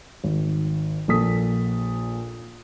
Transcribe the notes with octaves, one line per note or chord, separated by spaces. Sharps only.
G#1
A#1 A#2 A4 D#6 B6